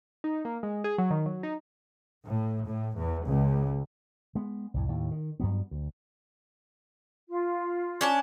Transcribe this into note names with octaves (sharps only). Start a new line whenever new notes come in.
D#4
A#3
G#3
G#4
F#3
D#3
F#3
D#4
A2
A2
E2
C#2
G#3 B3
C2 F2 A2
D#2 A2
D#3
G2 F#3 B3
D2
F4
C#4 D4 A5